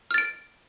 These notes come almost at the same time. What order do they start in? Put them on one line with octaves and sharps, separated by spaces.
F6 A6 D7